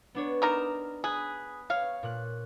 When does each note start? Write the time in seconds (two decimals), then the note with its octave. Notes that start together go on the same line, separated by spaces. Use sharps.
0.15 B3 D4 C#5
0.42 B3 D#4 A#4 D6 E7
1.04 G#4 B5 D#6 F#6
1.70 C#5 F5
2.03 A#2 F#6